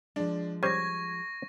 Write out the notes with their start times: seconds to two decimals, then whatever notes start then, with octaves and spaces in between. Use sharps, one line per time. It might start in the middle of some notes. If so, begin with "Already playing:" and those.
0.16 F3 G#3 D4
0.63 G3 C#4 C5 C#6 G#6 A#6